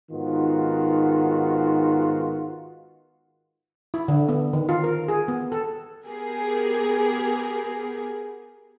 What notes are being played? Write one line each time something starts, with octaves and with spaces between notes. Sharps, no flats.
G#2 D#3 B3 F4 F#4
E4
D3
B3
D#3
F4
A#4
G#4
B3
A4
B3 G4 G#4 A#4